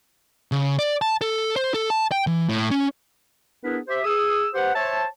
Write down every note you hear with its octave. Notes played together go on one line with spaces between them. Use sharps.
C#3
D5
A5
A4
C5
A4
A5
G5
E3
A2
C#4
B3 D4 E4 G#4 A#4 B4
G4 C5 E5
G#4 D#6 E6
G4 B4 C5 F#5
C5 C#5 E5 A5